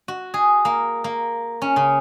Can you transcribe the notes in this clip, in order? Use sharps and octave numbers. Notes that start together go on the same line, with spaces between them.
F#4
G#4
A#3
A#3
C#4
C#3